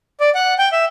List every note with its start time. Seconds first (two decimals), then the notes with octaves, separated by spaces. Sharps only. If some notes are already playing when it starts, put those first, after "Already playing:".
0.20 D5
0.35 F#5
0.59 G5
0.72 E5